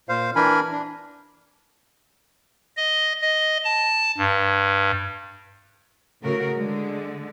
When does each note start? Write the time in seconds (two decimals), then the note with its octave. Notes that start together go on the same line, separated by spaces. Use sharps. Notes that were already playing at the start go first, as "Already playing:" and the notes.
0.09 A#2 C5 F5
0.36 E3 D4 A#4 G#5 B5
0.72 D4
2.77 D#5
3.21 D#5
3.64 A5
4.18 G2
6.23 A2 C#3 F#4 A#4
6.56 D3 G#3